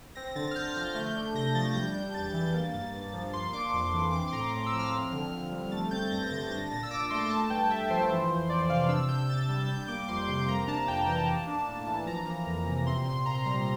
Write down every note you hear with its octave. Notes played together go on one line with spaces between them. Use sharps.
C4 A#6
D3 A6
F6
D3 G6
F3 F6
A3 G6
D4
C3 A#6
F3 A6
G3 G6
D4 G6
E2 A6
E3 A6
A#3
G2
G2
F3
A#3 C6
D4 D6
F2
E3
C4 D6
C6
A2 A#5
A2
E6
F3
F6
C4 F6
D3
D3
G3
A3 A6
C4 G6
G2 A#6
D3 A6
D4 A#6
A#2 A6
E6
A#2 D6
A3 C6
A3 A5
G2 G5
G2 E5
F3 C5
E3
F2
F2 D5
C3 F5
D4 E6
C3 G6
C3 A6
G3
G3 G6
A#3 D6
F2 C6
C3 C6
A#3 A#5
D4 A5
F2 G5
E3 A5
A#3
D4
A2
E3
F3 A#5
A#3
F2
C3
C4 C6
A#2 C6
A#2 A#5
G3 A#5